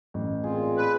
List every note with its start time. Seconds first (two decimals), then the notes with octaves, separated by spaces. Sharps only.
0.14 A1
0.44 A#2 C4 F4 G#4
0.77 B4